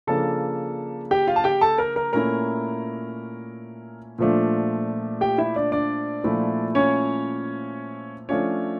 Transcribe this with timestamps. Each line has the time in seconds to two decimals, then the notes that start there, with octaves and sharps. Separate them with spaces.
0.07 C#3 F3 A#3 D4 A4 A5
1.11 G4 G5
1.27 F4 F5
1.36 A5
1.44 G4 G5
1.61 A4 A5
1.78 A#4 A#5
1.96 A#4 A#5
2.13 A#2 A3 C#4 E4 A#4 A#5
4.19 A#2 F3 A3 D4
5.21 G4 G5
5.38 E4 E5
5.56 D4 D5
5.72 D4 D5
6.24 A#2 F3 A3 E4
6.75 C#4 C#5
8.29 F3 A3 C#4 D4 F4 C#5